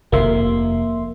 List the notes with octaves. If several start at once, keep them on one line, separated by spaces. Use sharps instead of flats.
F1 D#2 C3 A#3 E5 C6